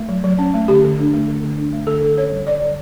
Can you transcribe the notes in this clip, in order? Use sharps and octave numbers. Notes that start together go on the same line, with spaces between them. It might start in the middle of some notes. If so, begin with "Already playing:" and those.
Already playing: A3
F#3
F#3
C#4
A3
D3 G4
D3
D4
A3
D3
D3
D4
A3
D3 A4
D3
C#4 C#5
G3
D3 D5
D3